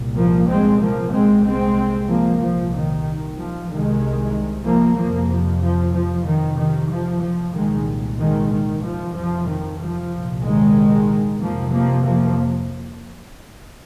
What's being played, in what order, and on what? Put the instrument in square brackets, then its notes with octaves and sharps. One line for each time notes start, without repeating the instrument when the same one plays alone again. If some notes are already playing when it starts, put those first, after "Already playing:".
Already playing: [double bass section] C2 A#2
F3 A#3
G#3 C4
F3 A#3
C2 A#2 G#3 C4
G#3 C4
F3 A#3
C2 A#2 F3
D#3
F3
C2 C3 D#3 G#3
F3 A#3
F2 C3 F3 A#3
F3
F3
F3
F2 C3 D#3
D#3
F3
F3
C2 A#2 D#3 G#3
D#3 G#3
D#3
F2 C3 F3
F3
D#3
F3
C2 A#2
D#3 G#3
F2 C3 F3 A#3
F3 A#3
F3 A#3